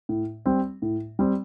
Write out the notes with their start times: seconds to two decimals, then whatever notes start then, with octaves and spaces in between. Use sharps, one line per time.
0.09 A2
0.46 G3 C4
0.82 A2
1.19 G3 C4